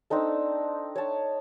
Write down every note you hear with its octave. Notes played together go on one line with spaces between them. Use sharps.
C4 D4 D#4 A4
C#5 A5